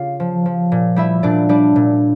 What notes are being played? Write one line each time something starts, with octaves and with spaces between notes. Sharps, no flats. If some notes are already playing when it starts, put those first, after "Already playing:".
Already playing: C#3 F4 G4 F5
F3
F3
A#2
G3 E4 E5
A#2 D4 D5
G3 D4 D5
A#2